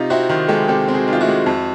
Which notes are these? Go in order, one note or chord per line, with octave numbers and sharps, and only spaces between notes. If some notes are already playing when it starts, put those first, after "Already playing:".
Already playing: C3 D#4 F4
C4 E4 F#4
D#3
G#3 G4 A4
C3 G4 A4
C4
F#4 G#4
D#3
F4
E4 F#4
G#3
F2